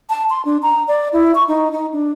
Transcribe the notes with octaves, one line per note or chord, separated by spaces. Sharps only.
A5
C6
D4
A#5
D5
E4
C#6
D#4
D#4
D4